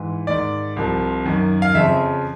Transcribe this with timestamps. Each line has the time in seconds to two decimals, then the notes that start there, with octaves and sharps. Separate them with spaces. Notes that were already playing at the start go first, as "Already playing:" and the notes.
Already playing: G#2 E3
0.27 G#2 D#3 D5
0.76 C2 C3 F3
1.25 F#2 D#3
1.62 F5
1.75 F2 C#3 F3 E5